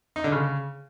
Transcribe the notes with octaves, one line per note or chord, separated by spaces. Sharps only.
D#4
D3
C#3